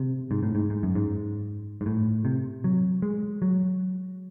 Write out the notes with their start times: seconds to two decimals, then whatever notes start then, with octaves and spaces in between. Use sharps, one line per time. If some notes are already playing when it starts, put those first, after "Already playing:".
Already playing: C3
0.31 G#2
0.43 A2
0.55 G#2
0.70 G#2
0.83 F#2
0.95 G#2
1.81 G#2
1.86 A2
2.25 C3
2.64 F#3
3.02 G#3
3.42 F#3